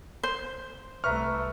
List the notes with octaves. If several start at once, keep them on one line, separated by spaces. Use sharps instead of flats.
C5
C2 A3 B4 E5 A#5 C#6 F6